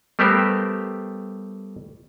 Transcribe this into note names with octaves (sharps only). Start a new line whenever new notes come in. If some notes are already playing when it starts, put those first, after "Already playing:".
G3 A3 B3 G4 A#4 C5